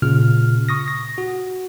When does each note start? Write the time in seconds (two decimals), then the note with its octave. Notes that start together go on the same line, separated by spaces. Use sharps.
0.02 A#2 C#3 F4 F6
0.69 C#6 D#6 A#6
0.88 A#6
1.18 F#4